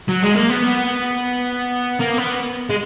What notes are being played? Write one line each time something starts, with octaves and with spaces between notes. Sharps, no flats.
F#3
G#3
A#3
B3
A#3
B3
G#3